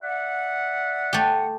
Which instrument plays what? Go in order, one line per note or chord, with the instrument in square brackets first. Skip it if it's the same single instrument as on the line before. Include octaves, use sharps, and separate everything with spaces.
[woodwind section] D5 E5 F#5
[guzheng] A3 G4